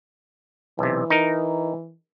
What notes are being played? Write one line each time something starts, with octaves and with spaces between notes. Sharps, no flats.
B1 C3 E3
D#4 A#4